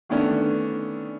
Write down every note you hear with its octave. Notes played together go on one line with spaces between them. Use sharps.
D3 D#3 A3 B3 C#4 D4